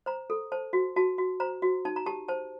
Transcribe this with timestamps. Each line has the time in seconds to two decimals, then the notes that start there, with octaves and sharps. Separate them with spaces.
0.06 C5 A#5
0.30 A4
0.52 C5 A5
0.73 F#4
0.96 F#4 A5
1.18 F#4
1.40 C5 A#5
1.62 F#4
1.85 D#4 A5
1.96 A#5
2.06 G4 A5
2.28 C5 A5